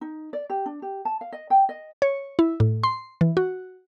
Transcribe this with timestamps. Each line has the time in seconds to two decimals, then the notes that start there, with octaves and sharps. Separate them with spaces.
0.01 D#4
0.33 D5
0.50 G4
0.66 D4
0.82 G4
1.05 A5
1.21 F5
1.33 D#5
1.50 G5
1.69 D#5
2.02 C#5
2.39 E4
2.60 A2
2.83 C6
3.21 E3
3.37 F#4